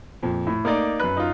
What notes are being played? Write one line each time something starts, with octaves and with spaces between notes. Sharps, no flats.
F2 A#2
A2
A3 A#3 D#4 D5
F#2 B4 F#6
D#4 F4